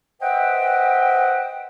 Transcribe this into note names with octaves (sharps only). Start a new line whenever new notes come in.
B4 C5 D#5 E5 F#5 G5